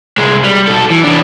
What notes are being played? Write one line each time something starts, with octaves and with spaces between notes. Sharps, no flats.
C2 G#3
G3
B2 A4
E3
E3 D4